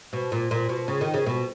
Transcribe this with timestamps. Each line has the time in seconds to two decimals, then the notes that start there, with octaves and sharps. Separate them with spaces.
0.13 B2
0.32 A#2
0.51 A#2
0.69 B2
0.88 C#3
1.01 D#3
1.14 C#3
1.26 B2